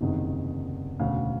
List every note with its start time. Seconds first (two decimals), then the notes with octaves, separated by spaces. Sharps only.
0.01 F#1 E2 C3 D#3
0.99 E1 D2 C#3 F5